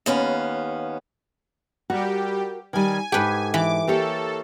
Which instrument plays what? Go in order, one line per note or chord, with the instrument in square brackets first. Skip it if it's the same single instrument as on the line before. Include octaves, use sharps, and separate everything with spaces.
[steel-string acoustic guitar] D#2 B3 C#4 F5
[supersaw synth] G3 G4 [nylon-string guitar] F#4 A#4 F#5
[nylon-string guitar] D#3 G3 [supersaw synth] G#5
[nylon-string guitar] G#2 A4 [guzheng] G4 B4
[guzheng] E3 [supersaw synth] D6
[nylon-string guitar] A#3 G4 C#5 [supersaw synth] A4